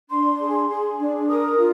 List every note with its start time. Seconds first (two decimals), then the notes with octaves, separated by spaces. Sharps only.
0.09 D4 C6
0.40 G#4
0.69 G#4
0.99 D4
1.29 A#4 D#6
1.58 F4